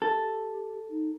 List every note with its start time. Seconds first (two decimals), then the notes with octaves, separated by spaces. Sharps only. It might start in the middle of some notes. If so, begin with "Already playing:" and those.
0.02 G4 A4
0.90 D#4